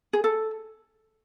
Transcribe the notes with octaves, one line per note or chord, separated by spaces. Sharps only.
G#4
A4